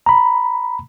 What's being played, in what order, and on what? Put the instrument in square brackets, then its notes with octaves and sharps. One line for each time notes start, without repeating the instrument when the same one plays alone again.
[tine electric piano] A#5 B5